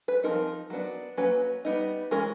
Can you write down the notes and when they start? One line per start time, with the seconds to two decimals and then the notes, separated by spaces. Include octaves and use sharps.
0.08 B4
0.23 F3 G#3 C4 D#4 A#4
0.70 F#3 B3 D4
1.17 F#3 A#3 C#4 B4
1.65 G3 B3 D#4
2.11 E3 G#3 C#4 A#4